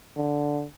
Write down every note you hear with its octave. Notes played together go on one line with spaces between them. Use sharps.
D3